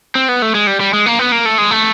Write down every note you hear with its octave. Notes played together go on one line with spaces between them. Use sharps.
C4
B3
A3
G#3
G3
G3
G#3
A#3
B3
A#3
A3
G#3
A3